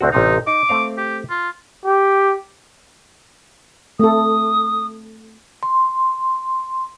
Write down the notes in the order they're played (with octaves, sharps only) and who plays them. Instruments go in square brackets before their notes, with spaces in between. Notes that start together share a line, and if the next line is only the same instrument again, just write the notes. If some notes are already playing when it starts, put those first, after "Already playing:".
[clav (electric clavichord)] D2 C4 F#4
[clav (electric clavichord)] A1 C3 F5 [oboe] D#4
[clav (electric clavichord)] D#4 [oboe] D6
[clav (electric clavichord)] A3 C4 F5
[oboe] G4
F4
[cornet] G4
[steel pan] A3 C4 A4 [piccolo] D#6
[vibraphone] C6